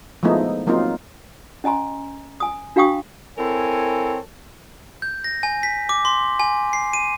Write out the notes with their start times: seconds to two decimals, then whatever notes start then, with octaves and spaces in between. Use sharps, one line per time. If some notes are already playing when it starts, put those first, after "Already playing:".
0.23 F3 G#3 A3 B3 D#4 E4
0.67 F#3 A#3 C4 D#4 F4
1.64 C#4 D#5 G#5 A#5 C6
2.40 G#5 D#6
2.76 D4 F#4 F5 G5 C#6 D#6
3.38 C4 E4 A4 A#4 C#5 G#5
5.02 G6
5.24 A#6
5.43 G#5
5.63 B6
5.89 D6
6.05 C6
6.40 G#5
6.73 C7
6.93 D#7